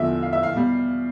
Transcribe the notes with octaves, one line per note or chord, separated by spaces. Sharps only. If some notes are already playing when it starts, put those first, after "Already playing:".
Already playing: E2 D3 F3 E5
F5
E5
F5
B2 G3